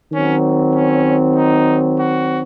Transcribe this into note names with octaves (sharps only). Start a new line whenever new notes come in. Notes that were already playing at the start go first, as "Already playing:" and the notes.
D#3 F#3 C4 C#4
C#4
D#4
F#4